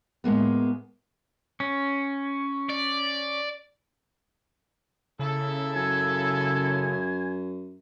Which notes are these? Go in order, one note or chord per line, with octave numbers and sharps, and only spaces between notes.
A2 G#3 A#3 B3
C#4
D5
C#3 A#3 E4 A4
F#2 G#5